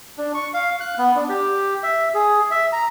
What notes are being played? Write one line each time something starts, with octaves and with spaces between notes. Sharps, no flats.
D4
C#6
F5
F#6
B3
D4
G4
E5
G#4
E5
A#5